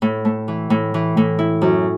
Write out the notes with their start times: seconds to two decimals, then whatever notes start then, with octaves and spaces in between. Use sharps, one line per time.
0.02 A2
0.25 A3
0.48 E3
0.70 A2
0.94 E3
1.17 A2
1.39 E4
1.62 F#2